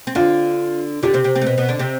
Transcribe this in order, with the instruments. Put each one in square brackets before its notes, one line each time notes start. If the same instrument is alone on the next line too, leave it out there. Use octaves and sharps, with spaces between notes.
[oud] C4
[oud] D3 D4 [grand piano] F4
[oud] D3 D4 [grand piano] G4
[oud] C3 C4
C3 C4
C3 C4
A3
B2 B3
B2 B3
D3 D4
C3 C4